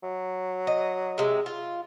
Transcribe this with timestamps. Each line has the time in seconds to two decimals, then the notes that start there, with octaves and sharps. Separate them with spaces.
0.03 F#3
0.67 D#5
1.18 C3 G#3
1.46 F4